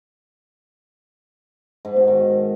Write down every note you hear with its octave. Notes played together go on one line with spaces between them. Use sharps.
G#2
B2
D#3